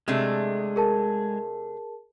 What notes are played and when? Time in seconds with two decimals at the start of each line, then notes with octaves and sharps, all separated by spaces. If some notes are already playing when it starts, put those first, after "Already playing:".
0.08 C3 G#3 A3 D4
0.76 G#4 A#4 A5